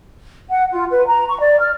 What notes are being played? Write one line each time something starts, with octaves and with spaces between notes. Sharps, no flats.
F#5
F4
B4
A#5
C#6
D5
F6